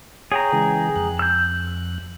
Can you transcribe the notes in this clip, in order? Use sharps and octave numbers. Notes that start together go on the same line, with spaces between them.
G#4 C#5 G5 A#5
C#3 E3 G#3
F2 F#6
E6 G6